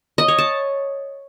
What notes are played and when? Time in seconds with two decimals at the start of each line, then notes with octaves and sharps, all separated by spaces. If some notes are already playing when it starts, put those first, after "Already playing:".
0.18 D#5
0.28 C#5
0.38 A5